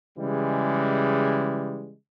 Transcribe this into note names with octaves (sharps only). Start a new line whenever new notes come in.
C#3 E3 G3 G#3